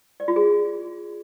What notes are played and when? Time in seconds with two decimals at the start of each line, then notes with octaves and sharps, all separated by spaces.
0.20 D5
0.28 F4
0.36 G#4